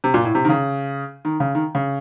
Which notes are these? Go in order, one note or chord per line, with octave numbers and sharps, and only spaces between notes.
C3
A#2
A2
C3
D#3
C#3
D#3
C#3
D#3
C#3